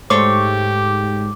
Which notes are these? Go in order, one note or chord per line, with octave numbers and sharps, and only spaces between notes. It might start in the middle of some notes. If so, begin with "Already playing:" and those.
G#2 A3 G4 C5 C#5 D6